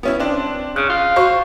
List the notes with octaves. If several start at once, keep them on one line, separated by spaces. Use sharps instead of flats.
B3 C#4 E4
C4 D4
C#3 F#6
F4
F#4 C5 C#6